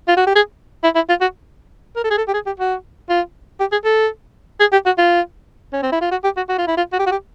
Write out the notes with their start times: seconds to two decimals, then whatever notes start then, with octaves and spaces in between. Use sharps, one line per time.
0.08 F4
0.17 F#4
0.27 G4
0.36 G#4
0.84 E4
0.95 E4
1.09 F4
1.21 F#4
1.96 A#4
2.04 A4
2.11 G#4
2.18 A4
2.28 G4
2.34 G#4
2.46 G4
2.60 F#4
3.10 F4
3.60 G4
3.72 G#4
3.85 A4
4.60 G#4
4.72 G4
4.86 F#4
4.98 F4
5.73 C#4
5.83 C4
5.92 E4
6.02 F4
6.11 F#4
6.24 G4
6.37 F#4
6.49 F#4
6.58 F4
6.68 E4
6.77 F4
6.93 F#4
6.99 G4
7.07 F#4
7.11 G4